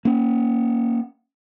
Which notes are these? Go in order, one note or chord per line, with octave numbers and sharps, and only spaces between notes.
A#3 C#4